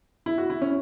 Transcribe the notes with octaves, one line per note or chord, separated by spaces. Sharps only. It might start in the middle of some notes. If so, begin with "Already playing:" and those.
E4
F#4
E4
C#4